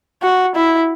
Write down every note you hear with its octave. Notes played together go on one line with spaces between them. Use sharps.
F#4
E4